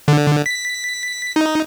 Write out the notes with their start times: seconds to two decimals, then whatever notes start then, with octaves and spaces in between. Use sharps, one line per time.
0.08 D3
0.46 B6
1.36 D#4